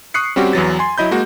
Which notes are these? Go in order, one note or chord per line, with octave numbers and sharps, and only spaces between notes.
C#6 D#6 F#6 C7 C#7
G3 C4 C#4 F#4 G4
E2 E3 F#3 A6
G#5 C6
F#3 E4 D#5 B5 G6
G#3 A#3 F#4